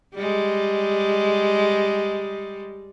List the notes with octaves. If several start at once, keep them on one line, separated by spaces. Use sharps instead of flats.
G3 G#3